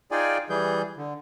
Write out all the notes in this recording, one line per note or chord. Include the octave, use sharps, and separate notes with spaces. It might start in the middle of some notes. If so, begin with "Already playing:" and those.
D#4 F4 G#4 D5 G5 G#5
E3 G3 G#4 G6
D3